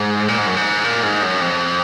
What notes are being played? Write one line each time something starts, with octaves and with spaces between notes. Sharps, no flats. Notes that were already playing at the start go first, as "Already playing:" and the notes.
Already playing: G#2
A#2
G#2
F#2
G#2
A#2
G#2
F#2
F2